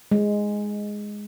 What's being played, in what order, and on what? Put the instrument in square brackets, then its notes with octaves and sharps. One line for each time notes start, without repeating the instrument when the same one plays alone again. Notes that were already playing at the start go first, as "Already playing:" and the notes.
[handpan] G#3